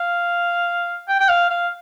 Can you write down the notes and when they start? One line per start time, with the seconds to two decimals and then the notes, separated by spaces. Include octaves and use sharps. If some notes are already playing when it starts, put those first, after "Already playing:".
Already playing: F5
1.08 G5
1.20 G5
1.29 F5
1.50 F5